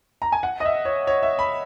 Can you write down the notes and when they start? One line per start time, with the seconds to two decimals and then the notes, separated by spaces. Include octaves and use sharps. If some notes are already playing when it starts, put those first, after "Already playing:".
0.22 A#5
0.32 G#5
0.43 F#5
0.60 D#5
0.65 E5
0.85 C#5
1.07 C#5
1.23 E5
1.39 B5